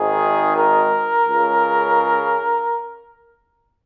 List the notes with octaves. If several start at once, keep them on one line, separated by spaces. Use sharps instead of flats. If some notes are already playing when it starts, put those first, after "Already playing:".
Already playing: G#1 G#2 D#3 G#4
A#4
C#2 C#3